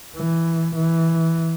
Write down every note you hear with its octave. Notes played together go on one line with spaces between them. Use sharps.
E3
E3